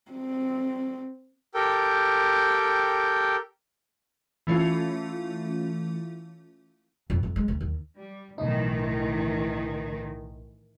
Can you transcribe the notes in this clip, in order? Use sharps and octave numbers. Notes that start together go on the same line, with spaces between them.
C4
G4 A4 A#4 G5
E3 A3 C#4 F4
F2
F2
G#3
D2
D#2
G3
B1 A2 D#3 E3 D#4